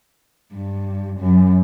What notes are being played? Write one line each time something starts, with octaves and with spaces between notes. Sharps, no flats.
G2
F#2